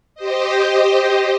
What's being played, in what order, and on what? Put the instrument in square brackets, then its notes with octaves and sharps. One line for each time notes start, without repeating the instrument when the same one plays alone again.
[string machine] G4 C5 D#5